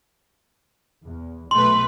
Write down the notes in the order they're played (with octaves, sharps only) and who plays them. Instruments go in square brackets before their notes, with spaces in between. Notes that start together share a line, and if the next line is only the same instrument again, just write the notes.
[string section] E2
[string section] B1 A3 B4 [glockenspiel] C6